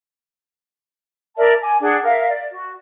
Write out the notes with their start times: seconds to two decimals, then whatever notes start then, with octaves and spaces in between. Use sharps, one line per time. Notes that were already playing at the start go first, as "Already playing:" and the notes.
1.37 A#4 D5 E5 A5
1.61 G#5 D6
1.81 D4 G#4 F#5
2.04 A#4 E5 F5
2.29 D5
2.52 F#4